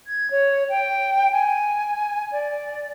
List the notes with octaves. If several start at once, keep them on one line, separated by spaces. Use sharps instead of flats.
G#6
C#5
G5
G#5
D5